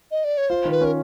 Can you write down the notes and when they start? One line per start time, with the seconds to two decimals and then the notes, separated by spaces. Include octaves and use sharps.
0.11 D#5
0.24 D5
0.38 C#5
0.49 F4 C5
0.65 D#3
0.71 B4
0.81 C#4 A#4